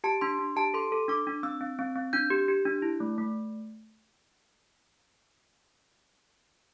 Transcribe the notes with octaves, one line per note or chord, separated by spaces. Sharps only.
G4 A5
D4 C6
D4
G4 A5
A4 C6
A4
D4 D6
D4
C4 E6
C4
C4
C4
D4 G6
G4
G4
D4
E4
A3
A3